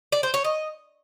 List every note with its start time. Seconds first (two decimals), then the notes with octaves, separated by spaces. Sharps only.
0.12 D5
0.23 C5
0.34 C#5
0.44 D#5